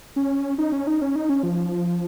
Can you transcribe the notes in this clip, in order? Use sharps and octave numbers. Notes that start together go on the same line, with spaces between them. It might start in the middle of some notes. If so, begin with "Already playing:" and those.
C#4
D#4
C#4
D#4
C#4
D#4
C#4
F3